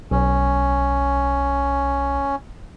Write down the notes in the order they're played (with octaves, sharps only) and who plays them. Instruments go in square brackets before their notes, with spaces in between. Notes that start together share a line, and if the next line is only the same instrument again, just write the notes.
[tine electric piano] B1 [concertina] C#4